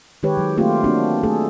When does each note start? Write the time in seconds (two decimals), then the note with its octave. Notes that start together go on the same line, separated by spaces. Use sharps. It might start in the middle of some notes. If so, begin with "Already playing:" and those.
0.23 D#3 G#3 G4 B4 C#5
0.37 F#3
0.57 A3 A#3 C4 F4 G4
0.84 A#3 C4 D4 F#4
1.23 A3 G#4 A4